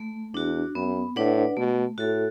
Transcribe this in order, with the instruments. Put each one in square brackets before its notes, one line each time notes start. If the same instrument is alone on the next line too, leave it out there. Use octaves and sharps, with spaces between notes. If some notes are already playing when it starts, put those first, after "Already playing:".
Already playing: [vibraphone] A3
[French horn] E2 [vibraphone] D4 F#4
[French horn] F#2 [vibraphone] B3
[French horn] A2 [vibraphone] D4 B4 D5 F#5
[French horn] B2 [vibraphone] A3
[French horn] A2 [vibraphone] F#4 A4